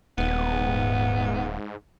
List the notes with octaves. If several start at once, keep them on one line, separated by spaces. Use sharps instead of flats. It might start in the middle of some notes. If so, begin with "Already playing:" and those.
D#1 G#2 B3